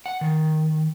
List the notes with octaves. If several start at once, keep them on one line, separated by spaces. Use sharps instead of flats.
F#5
D#3